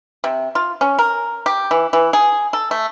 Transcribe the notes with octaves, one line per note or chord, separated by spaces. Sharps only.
C3
F4
C#4
A#4
G4
E3
E3
G#4
A4
A3